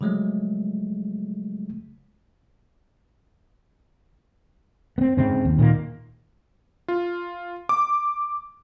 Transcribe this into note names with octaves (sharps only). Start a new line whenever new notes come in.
C#3 F3 F#3 G#3 A3
B3 C4
G#2 C#3 C4
D#2
A#2 D#3 G3 A#3
F4
D6